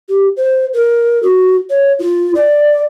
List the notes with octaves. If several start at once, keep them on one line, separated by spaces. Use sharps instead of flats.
G4
C5
A#4
F#4
C#5
F4
D5